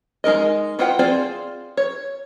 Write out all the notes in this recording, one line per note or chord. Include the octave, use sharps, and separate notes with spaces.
G#3 D#4 A#4 D#5
E4 F4 C5 F#5 G5
C4 F4 G#4 C5 D5
C#5